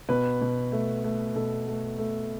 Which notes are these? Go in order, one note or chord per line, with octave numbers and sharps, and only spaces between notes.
B2 B4
B2
A3
A3
B2 A4
A3
A3